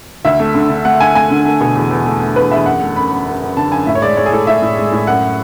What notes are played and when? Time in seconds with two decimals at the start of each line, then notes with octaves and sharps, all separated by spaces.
0.25 D2 E5
0.40 A3
0.55 D3
0.70 D3
0.85 A3 F#5
1.00 D3 G#5
1.15 A3 G#5
1.30 D3
1.45 A3
1.61 B2
1.75 E2
1.91 E2
2.06 A3
2.21 A3
2.36 E2 B4
2.51 E2 E5
2.66 F#2 F#5
2.81 A3
2.96 F#2 B5
3.11 F#2
3.27 F#2
3.42 F#2
3.57 D3 A5
3.71 F#2 G#5
3.86 A2 E5
3.95 C#5
4.02 G#3 D5
4.17 G#3 C#5
4.26 G#4
4.32 A2 A4
4.47 A2 E5
4.62 A2
4.77 G#3
4.92 A2
5.07 F#2 F#5